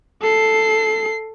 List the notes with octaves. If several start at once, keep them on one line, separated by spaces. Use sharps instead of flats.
A4 C7